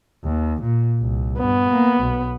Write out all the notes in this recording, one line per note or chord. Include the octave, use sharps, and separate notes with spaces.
D#2
A#2
C2
G2 B3
A#3
B1